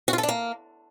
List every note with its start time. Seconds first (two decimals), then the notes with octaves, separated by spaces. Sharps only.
0.08 F#4
0.13 F4
0.18 A4
0.23 D4
0.29 A#3